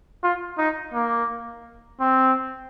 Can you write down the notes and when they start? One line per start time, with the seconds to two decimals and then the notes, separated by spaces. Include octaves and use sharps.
0.23 F4
0.58 D#4
0.93 A#3
2.00 C4